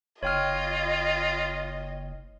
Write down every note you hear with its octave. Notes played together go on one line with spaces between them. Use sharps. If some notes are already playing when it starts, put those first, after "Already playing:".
F#1 F4 C#5 D#5 G5 F6